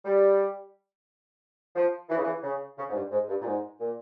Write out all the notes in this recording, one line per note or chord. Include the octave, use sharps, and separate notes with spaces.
G3
F3
E3
C#3
E3
C#3
C#3
G#2
G2
G#2
G2
A#2
G#2
A#2